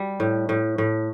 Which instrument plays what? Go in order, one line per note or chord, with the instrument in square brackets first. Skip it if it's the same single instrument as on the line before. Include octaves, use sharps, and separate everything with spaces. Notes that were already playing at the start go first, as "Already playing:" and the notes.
Already playing: [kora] G3
A2
A2
A2